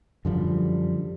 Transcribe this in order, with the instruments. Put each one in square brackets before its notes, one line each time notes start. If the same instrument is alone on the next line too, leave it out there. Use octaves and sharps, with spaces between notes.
[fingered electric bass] F#2 D3 F3 G3